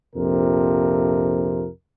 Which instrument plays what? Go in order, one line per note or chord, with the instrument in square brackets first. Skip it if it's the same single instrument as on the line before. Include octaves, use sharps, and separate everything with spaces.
[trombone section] A#1 F2 C3 F3 A#4